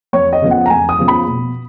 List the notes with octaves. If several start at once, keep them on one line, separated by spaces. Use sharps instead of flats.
F2 C#5
D#5
C#3 F3 B3
F#5
A#5
F2 G#5
D#6
C#3 F3 B3
B5
B2